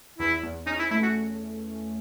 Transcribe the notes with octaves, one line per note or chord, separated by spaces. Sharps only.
E2 E4
E2
C#4 D#4
E4
A3 E4
F#4